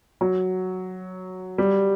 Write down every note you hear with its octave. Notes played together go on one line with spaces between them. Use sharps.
F#3
G3